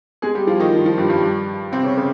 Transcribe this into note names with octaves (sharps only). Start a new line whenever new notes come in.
G#3 G#4
G3 G4
F3 F4
D#3 D#4
F3
F3
G2 G3
G2 G3
C3 C4
C#3 C#4
C#3 C#4